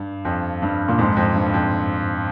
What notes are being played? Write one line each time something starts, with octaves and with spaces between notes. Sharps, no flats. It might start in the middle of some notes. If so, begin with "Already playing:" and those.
Already playing: G2
F2
G2
A#2
F2 G#2
F2
G2
F2